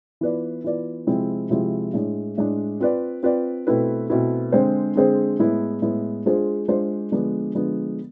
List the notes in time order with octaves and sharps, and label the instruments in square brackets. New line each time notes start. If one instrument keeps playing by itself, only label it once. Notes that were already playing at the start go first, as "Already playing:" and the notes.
[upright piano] E3 B3 F4 B4 D5
E3 B3 F4 B4 D5
C3 F3 G#3 C4 E4
C3 F3 G#3 C4 E4
A2 G#3 D4
A2 G#3 D4
C4 F4 B4 D5
C4 F4 B4 D5
B2 A3 C4 E4 B4
B2 A3 C4 E4 B4
D3 G#3 C4 G#4 C5
D3 G#3 C4 G#4 C5
A2 G#3 B3 E4
A2 G#3 B3 E4
G#3 D4 F4 G#4 C5
G#3 D4 F4 G#4 C5
D3 F3 G#3 B3 D4
D3 F3 G#3 B3 D4